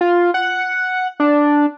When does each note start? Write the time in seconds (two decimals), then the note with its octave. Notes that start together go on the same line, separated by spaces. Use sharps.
0.01 F4
0.34 F#5
1.20 D4